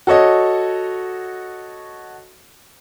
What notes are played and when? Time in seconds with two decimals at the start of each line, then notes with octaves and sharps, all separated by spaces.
0.07 F#4 A4 C#5 D#5